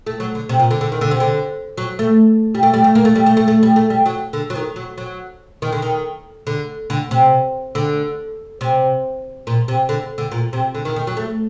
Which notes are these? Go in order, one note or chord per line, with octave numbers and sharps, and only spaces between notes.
A3
F#3
D3
C3
A#2
D3
D3
D#3
D3
C3
D3
F#3
A3
G3
A3
G3
A3
A#3
A3
G3
A3
A3
A3
G3
A3
G3
F#3
D3
F#3
D#3
F#3
F#3
D#3
D3
D#3
D3
D3
C3
D3
C3
A#2
C3
D3
D3
A#2
C3
D3
D#3
D#3
F#3
A3